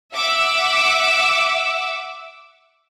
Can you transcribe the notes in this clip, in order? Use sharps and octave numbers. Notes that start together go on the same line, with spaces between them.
E5 F#5 D6 E6